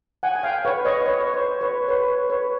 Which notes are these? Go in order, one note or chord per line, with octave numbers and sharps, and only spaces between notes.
F#5 G#5
G#5
F5 G5
B4 C#5
C#5 D#5
B4 C#5
C5
B4 C#5
B4 C#5
B4 C#5